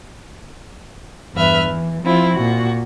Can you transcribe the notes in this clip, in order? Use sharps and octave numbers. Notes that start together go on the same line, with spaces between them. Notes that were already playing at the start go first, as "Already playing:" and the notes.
E2 G2 B4 E5 F6
E3
F3 C4 E4 F4
A#2 F#4